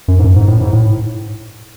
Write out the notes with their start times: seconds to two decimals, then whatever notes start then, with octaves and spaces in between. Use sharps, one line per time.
0.08 F#2
0.19 G#2
0.24 F#2
0.36 G#2
0.48 A2
0.61 G#2
0.73 A2